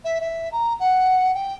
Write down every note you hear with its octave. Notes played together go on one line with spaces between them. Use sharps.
E5
E5
A#5
F#5
G5